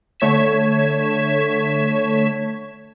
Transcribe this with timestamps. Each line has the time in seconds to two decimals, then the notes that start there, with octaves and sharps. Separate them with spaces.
0.20 D3 A3 C#5 G#6 B6 E7